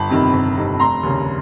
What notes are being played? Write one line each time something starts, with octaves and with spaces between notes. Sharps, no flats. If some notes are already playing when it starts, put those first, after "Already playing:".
Already playing: G1 A5 B5
F2 C3 D#3
G1
F2 C3 D#3
F1 A#5 C6
D#2 C#3